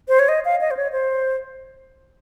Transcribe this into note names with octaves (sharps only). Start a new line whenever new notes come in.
C5
C#5
D#5
F5
D#5
C5
C#5
C5